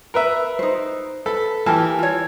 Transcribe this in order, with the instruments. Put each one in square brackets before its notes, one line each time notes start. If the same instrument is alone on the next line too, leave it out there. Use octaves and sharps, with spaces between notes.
[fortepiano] A#4 B4 E5
[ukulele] D#4 C5
[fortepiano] A4 [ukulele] B4
[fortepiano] E3 [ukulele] G4 A#4 A5
[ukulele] F4 C#5